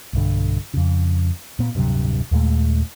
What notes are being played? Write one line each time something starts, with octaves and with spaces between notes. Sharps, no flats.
B1 G2 D3
F2 C#3
A#2 B3
D1 G2 C3 F#3
D#2 A#2 G#3 A3